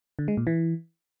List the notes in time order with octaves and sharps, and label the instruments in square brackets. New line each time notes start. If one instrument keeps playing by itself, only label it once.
[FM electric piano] D3
G#3
A#2
E3